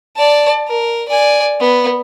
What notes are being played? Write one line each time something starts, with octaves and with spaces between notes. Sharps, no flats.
D5 A5
A#4
D5 G#5
B3